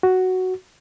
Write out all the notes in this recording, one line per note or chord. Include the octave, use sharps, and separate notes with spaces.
F#4